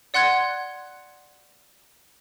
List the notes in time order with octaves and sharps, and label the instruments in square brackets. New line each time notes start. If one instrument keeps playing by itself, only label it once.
[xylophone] D5 F#5 C6 F#6 G#6